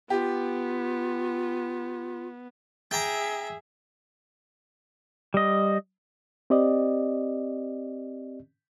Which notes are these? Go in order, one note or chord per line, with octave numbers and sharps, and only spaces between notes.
B3 F4 G4
G#4 E5 G5 A#5
G3 D#5
C4 G4 D5 D#5